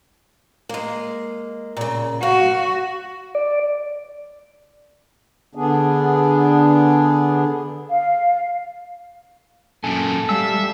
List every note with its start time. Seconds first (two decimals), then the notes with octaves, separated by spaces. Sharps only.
0.69 G#3 A#3
1.77 A#2 C#3
2.23 F#4 F5
3.35 D5
5.55 D3 B3 D4 G#4
7.90 F5
9.84 F#2 A#2 A4 G#5
10.29 G3 E5 F5 E6